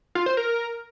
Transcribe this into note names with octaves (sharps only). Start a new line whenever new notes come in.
F4
C5
A#4